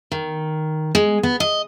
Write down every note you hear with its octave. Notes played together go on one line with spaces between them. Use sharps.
D#3
G#3
B3
D#5